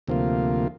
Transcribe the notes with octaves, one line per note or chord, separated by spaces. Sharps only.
D2 C3 F3 A#3 F4